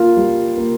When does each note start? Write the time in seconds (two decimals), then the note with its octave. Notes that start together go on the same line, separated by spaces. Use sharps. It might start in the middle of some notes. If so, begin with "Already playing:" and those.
Already playing: A#3 F4
0.17 G3
0.58 A#3